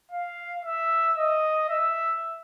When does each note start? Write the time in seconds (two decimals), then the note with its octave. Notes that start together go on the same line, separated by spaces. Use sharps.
0.12 F5
0.65 E5
1.18 D#5
1.69 E5